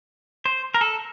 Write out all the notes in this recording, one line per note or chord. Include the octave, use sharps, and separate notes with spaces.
C5
A#4
A4